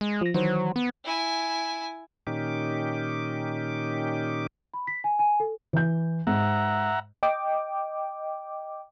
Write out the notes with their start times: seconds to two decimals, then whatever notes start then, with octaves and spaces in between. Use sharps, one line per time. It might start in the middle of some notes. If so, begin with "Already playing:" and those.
0.01 G#3
0.21 F3 A#6
0.34 D#3 E3 F#3 C5
0.76 B3
1.04 E4 G#5
2.27 A#2 D#3 C#4 D#4 G4 D6
4.74 B5
4.87 B6
5.04 G#5
5.19 G#5
5.40 A4
5.73 E3 G6
6.27 G#2 E5 F#5 A#5
7.23 D#5 G5 D6